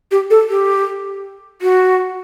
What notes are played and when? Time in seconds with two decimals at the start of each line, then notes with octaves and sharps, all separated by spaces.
0.11 G4
0.30 A4
0.49 G4
1.62 F#4